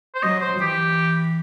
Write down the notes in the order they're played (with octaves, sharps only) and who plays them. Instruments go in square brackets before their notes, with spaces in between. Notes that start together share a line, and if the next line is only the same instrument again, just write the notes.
[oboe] C5
[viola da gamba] F#3 [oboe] D#5
[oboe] C5
[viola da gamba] E3 [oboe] G4